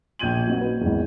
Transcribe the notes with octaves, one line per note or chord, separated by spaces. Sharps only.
A#1 G6 G#6 D#7 F#7
F#3 A#3 C4 D#4 F#4
B4
G#1 E2